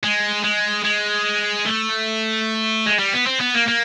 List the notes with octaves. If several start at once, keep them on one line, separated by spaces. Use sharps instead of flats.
G#3
G#3
G#3
A3
G#3
G3
B3
C4
B3
A#3
A#3